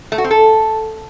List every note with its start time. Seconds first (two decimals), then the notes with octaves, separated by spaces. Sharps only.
0.12 A3
0.18 F#4
0.24 C4
0.31 A4